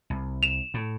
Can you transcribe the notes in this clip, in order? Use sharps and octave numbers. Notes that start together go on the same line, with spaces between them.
C2
E7 F7
A2